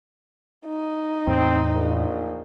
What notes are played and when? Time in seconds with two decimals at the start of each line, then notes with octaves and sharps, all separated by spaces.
0.67 D#4
1.27 E2 A2 C4
1.73 A#1